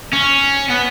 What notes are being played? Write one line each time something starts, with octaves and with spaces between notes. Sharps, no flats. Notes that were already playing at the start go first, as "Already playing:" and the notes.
C#4
B3